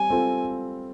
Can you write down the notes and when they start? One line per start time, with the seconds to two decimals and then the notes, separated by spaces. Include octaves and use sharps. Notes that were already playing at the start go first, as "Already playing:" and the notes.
Already playing: G3 C4 G#5
0.10 C4 F4 A4 C5